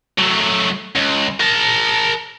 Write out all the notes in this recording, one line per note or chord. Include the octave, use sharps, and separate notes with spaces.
F#3 A3
C#2
A#4 A5